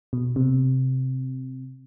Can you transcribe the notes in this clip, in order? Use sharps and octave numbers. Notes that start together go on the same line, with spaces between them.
B2
C3